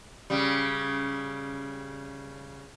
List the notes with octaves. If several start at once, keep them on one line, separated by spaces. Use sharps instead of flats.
C#3 G3